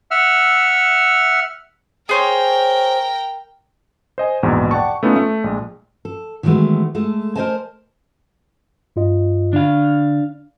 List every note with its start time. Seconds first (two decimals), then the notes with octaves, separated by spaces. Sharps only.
0.11 E5 F#5 E6 F6
2.09 G#4 A#4 C5 C#5 G5
4.18 C5 D#5 G#5
4.43 A#1 E2 G#2 B2
4.71 D5 F#5 G5 A5 C#6
5.03 A3 B3 C#4 D#4 F4
5.16 A3
5.44 A#1 G#3
6.05 A4
6.43 D#3 E3 F#3 G#3 A3 B3
6.95 G#3 A3 A4
7.36 A#4 C5 C#5 D#5 G#5 A5
8.96 G2 F4 D#5
9.53 D3 D4 F5